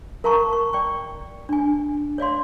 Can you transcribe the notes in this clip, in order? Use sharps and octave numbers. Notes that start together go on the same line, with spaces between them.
A#4 F5 A5 A#5 C#6
C#6
D5 G5 C#6
D4 G#5
C#5 D5 F5 C6